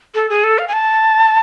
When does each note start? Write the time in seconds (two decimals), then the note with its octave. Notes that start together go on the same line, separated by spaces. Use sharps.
0.15 A4
0.30 G#4
0.44 A4
0.59 F5
0.68 G#5
0.73 A5